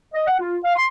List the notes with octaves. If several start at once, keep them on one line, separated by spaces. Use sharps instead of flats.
D#5
F#5
F4
F5
C6